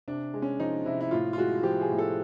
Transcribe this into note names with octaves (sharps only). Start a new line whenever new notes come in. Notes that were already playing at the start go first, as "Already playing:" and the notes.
C3 D4
G#3
C#4
F3 D#4
C3 E4
E4
A2 F4
F4
G#3 F#4
F3 G4
G#4
A2
A4